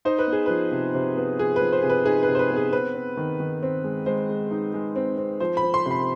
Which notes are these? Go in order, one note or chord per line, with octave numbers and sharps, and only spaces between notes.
D#4 C5
B4
B3
G#4
F3 B4
C3
C3
B3
F3 G#4
B4
F3
C5
C3 G#4
B4
D#4 G#4
B4
C3
C5
B4
B3
G#4
C4 B4
C4
D#3
D#3
C4
G#3
G#3 C5
G#3
D#4
G#3
C4
C4
F3 C5
B5
F3
C6
C3
B5